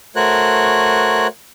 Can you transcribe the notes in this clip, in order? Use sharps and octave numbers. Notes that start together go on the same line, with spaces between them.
A3 F#4 A#4 C5 C#5 F#6